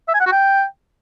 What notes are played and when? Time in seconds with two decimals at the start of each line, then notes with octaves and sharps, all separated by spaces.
0.08 E5
0.14 G#5
0.20 F#5
0.26 F#4
0.32 G5